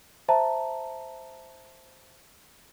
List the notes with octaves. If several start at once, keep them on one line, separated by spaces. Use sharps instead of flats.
C5 E5 A5 A#5